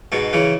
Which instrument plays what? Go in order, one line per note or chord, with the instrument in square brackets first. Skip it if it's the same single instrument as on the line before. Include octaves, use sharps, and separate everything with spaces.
[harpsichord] G#2 B2
C#3 E3